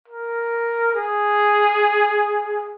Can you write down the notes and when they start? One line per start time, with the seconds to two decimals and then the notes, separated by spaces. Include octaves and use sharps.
0.08 A#4
0.95 G#4